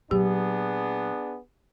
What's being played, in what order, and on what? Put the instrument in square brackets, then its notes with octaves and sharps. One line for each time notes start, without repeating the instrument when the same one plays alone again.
[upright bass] A#2 F#3 [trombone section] B3 D4 G#4 [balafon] G4